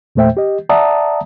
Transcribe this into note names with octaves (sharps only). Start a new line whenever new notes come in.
E2 A#2 A3 C5 E5 G5
G4 D#5
D5 E5 F#5 A5 A#5 D#6